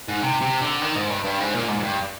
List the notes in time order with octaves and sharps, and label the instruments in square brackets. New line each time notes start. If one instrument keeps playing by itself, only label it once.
[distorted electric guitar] G#2
C3
C3
D3
D#3
G#2
G2
G2
G#2
A#2
G#2
G#2
G2